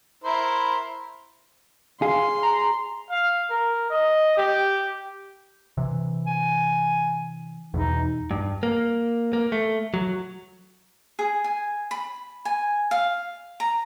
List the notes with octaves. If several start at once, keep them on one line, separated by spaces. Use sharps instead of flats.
E4 A#4 C5
G#4 F5 C6
A#5
F5
A#4
D#5
G4
C3 E3
G#5
E2 B2 E3 D#4
G2
A#3
A#3
A3
F#3
G#4
G#5
B5
G#5
F5
A#5